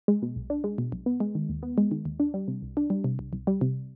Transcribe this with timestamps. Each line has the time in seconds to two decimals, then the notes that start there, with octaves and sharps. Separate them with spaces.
0.08 G#3
0.22 B2
0.36 B1
0.50 D4
0.64 G#3
0.78 B2
0.92 B1
1.06 B3
1.20 G#3
1.35 D#3
1.49 D#2
1.63 B3
1.78 G#3
1.91 D#3
2.05 D#2
2.20 D4
2.34 G3
2.48 C3
2.62 C2
2.77 D4
2.90 G3
3.04 C3
3.19 C2
3.33 C2
3.47 G3
3.61 C3